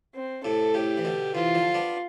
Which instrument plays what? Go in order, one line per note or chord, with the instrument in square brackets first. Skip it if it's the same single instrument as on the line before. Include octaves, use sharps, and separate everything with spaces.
[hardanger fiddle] C4
[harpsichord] A2 C3 [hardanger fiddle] A4
[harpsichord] A2 C3 [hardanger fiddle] G4
[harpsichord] E3
B2 D3
[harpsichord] C3 E3 [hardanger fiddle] F4
[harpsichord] D3 F3
B3 D4